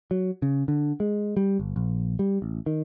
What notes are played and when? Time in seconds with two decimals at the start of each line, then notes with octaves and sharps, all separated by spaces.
0.11 F#3
0.42 C#3
0.68 D3
1.00 G#3
1.37 G3
1.59 G1
1.76 A#1
2.19 G3
2.42 A1
2.66 D#3